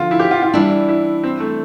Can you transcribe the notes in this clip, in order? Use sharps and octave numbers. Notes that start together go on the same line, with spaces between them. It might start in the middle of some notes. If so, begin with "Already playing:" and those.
Already playing: D3 F3 B3 F4
E4
G4
F4
F4
E3 G3 D4 E4
E4
C4
A3